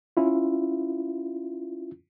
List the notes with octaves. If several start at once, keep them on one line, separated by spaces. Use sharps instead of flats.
C#4 E4 F4